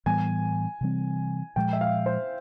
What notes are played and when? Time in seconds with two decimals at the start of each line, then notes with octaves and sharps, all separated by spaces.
0.06 A2 E3 G3 B3 G#5
0.81 C3 E3 G3 C4
1.56 A#2 F3 G#3 G5
1.73 E5
1.81 F5
2.06 C5